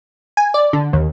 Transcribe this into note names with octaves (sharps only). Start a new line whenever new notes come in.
G#5
D5
D3
D#2